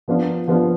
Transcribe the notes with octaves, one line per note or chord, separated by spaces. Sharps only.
F3 B3 D4 F4
F3 B3 D4 F4